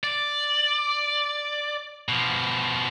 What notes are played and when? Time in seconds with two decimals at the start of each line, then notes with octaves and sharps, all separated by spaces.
0.04 D5
2.09 B2 F3